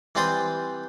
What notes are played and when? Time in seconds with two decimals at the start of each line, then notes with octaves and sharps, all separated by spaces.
0.15 E3 G3 C4 D5 C6 D#6